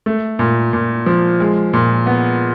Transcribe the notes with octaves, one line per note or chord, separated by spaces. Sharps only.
A3
A#2
A#2
F3
G#3
A#2
B3